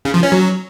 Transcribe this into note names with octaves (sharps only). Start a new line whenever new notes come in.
C#3
F3
C#4
F#3